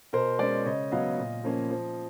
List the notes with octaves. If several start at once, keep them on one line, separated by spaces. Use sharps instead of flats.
B2 A#4 C5
G#3 C#4 C5 D5
C#3 C#5 D#5
F#3 B3 D#5 F5
A#2
F3 A#3 C#4
F3